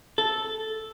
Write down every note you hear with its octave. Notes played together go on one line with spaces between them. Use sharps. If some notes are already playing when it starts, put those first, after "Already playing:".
A4